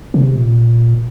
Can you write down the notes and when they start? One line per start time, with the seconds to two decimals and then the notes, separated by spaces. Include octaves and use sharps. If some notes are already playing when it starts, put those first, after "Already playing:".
0.14 C3
0.36 A#2